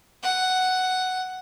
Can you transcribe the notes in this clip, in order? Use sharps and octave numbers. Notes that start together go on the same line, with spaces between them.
F#5